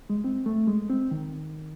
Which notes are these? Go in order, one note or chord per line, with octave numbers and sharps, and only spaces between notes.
G#3
C4
A3
G#3
C4
D#3